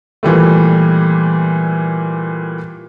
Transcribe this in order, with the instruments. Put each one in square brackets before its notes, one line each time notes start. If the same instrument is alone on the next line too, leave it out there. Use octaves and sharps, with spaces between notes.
[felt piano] A#2 E3 G3 A3